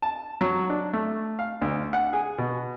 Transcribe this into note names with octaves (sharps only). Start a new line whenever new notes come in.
A5
F#3
D4
A3
F5
D2
F#5
G#4
B2